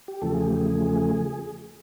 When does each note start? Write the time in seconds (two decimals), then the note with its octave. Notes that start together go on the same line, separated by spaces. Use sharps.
0.08 G4
0.22 E2 C#3 F3 A3 A4
0.34 G#4
0.45 G4
0.57 G#4